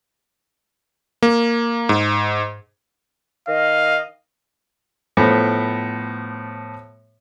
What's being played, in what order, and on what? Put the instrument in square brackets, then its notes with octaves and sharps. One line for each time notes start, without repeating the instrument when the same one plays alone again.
[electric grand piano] A#3
G#2
[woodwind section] D#3 D#5 [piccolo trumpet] F5
[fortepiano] A2 F3 A3 B3